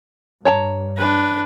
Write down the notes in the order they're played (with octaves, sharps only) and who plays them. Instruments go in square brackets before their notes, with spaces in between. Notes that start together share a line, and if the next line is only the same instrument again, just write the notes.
[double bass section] G2 [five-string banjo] C#5 A5 A#5
[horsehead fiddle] D4 B4